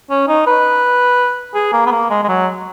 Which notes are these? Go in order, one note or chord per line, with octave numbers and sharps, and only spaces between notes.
C#4
D#4
B4
G#4
A#3
B3
A#3
G#3
G#3
F#3